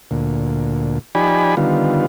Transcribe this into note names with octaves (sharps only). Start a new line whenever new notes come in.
D2 A#2
F3 D#4 G4 D5 G#5 B5
D3 D#3 G3 B3 F4